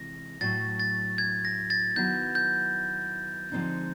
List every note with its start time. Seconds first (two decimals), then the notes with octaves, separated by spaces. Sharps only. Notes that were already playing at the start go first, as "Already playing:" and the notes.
Already playing: C3 E3 G#3 A#6
0.41 A2 F#3 A3 A6
0.80 A6
1.18 G#6
1.45 A#6
1.70 A6
1.96 D#3 F#3 B3 E4 G6
2.35 G6
3.52 D3 F3 G#3 C4 D#4